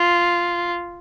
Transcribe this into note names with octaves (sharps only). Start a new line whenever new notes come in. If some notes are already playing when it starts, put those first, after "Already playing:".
Already playing: F4